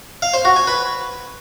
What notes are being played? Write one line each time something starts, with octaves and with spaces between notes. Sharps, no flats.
F5
C5
F#4
G#5
B4